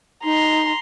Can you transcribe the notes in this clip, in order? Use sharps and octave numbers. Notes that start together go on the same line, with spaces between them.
D#4 A#5 C6